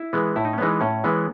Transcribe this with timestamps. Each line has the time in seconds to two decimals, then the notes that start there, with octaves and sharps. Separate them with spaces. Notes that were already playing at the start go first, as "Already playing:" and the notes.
Already playing: E4
0.13 E3 G#3 B3
0.36 A2 E4
0.45 D#4
0.53 C#4
0.58 E3 G#3 B3 D#4
0.81 A2 C#4
1.04 E3 G#3 B3